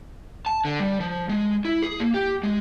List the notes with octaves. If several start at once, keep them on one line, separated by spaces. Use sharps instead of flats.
A5
D3
G3
F3
G#3
E4
G#4
A#3
G4
G#3